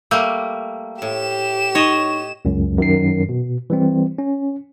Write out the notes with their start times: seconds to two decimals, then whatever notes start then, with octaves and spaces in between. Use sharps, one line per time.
0.11 G3 A3 A#3 E6 G6
1.02 A2 G4 E7
1.75 D#4 C#5 D#5 C#6
2.45 C#2 F#2
2.78 F#2 D#3 C7
3.29 B2
3.70 E3 G3 C4
4.18 C#4